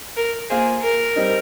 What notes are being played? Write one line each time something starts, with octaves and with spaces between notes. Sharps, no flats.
A#4
A#3 F4 G#4 C5
A#4
G3 C4 D#4